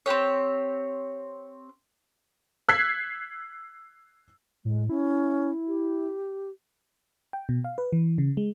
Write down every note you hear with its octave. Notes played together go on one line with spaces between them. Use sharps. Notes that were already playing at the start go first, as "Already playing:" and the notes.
C4 D4 G4 C#5
E6 F#6 G#6 B6 C7
A2 G#3
C#4 E4
G4
G5
B2
F5
B4
E3
C#3
G#3